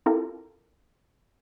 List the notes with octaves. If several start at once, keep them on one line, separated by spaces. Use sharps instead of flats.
C4 E4 F4 G4 A4 A#4